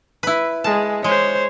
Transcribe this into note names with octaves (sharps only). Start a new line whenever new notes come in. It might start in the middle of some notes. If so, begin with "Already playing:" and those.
E4 B4
G#3 A5
G#3 C5 C#5